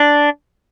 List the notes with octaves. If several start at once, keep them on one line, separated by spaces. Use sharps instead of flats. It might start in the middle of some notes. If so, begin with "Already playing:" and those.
Already playing: D4